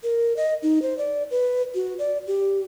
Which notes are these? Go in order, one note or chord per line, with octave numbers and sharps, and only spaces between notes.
A#4
D#5
D#4
C5
D5
B4
F#4
D5
G4